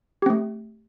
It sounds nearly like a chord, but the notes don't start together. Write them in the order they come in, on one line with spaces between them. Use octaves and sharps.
G4 C4 A3